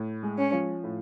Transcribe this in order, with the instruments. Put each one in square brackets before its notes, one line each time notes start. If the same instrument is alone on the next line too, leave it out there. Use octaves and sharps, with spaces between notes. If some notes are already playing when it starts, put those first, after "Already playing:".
Already playing: [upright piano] A2
G#3
[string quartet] C#4
[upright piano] F3
A2